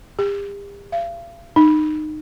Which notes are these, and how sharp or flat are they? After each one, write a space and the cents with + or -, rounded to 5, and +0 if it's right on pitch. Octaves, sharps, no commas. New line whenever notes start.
G4 +40
F5 -40
D#4 -25